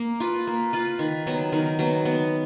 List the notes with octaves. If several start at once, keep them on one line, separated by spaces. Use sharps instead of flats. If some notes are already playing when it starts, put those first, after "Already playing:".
Already playing: A#3
F4 B4
A#3
F4 B4
D#3
F#3 B3
D#3
F#3 B3
B3